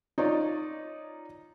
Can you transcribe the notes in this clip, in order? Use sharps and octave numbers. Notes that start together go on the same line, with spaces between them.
D#4 F4 C#5 D5